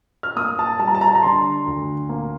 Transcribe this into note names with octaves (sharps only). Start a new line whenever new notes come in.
F6
A#3 D#6
A5
G3 A5
A#5
A5
A#5
A5
A#5
D3 C6
D2
A#3